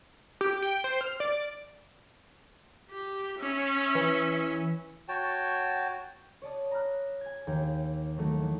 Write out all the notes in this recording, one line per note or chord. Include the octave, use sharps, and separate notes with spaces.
G4
G5
C5
F6
D5
G4
C#4 E5
E3
F#4 C#5 G5 A5
C#5 D5 A5 D#6
A#5 B5 F6 F#6
G#5 G#6
D#2 G5 G#6
D#3 F#3 A3
E3